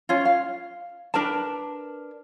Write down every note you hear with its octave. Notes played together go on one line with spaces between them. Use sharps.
C#4 F4
F5
D4 A#4 B4 A5